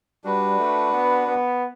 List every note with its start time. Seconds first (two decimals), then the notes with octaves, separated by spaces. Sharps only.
0.24 G3 D4 F#4 B4
0.59 A3
0.93 B3
1.28 B3